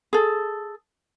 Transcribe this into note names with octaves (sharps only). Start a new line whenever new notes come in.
G#4 A4